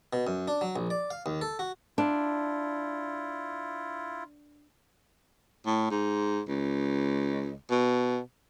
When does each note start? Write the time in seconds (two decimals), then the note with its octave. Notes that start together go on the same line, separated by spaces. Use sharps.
0.13 B2
0.27 F#2
0.48 D4
0.61 F#3
0.76 A#1
0.90 D5
1.11 F5
1.26 D#2
1.41 A4
1.59 F#4
1.98 D4 E4 F4
5.66 A2
5.91 G#2
6.49 C#2
7.71 B2